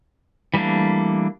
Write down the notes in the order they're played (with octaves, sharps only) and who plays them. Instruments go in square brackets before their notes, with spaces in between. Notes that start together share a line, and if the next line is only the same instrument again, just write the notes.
[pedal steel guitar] E3 G3 A3 A#3 D4